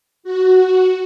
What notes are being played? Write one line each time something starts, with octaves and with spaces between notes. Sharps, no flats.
F#4